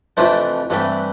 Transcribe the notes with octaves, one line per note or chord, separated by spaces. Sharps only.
F2 C3 E3 A3 D4 C5
G2 E3 A3 C4